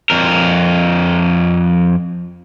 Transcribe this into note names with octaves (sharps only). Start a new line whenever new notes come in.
F2 A#4